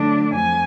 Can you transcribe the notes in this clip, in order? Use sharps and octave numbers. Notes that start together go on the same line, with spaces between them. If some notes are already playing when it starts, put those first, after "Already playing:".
Already playing: D3 F#3 A3 D4
F2 G#5